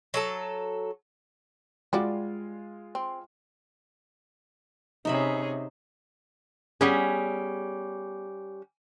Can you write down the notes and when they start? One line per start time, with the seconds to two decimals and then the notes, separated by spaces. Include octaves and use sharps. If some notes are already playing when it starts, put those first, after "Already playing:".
0.14 F#3 A4 A5
1.93 G3 G#3 F4 F#4 D5
2.95 C4
5.05 C3 C#4 D#4 G#4 E5 B5
6.81 G3 B3 C#4 G#4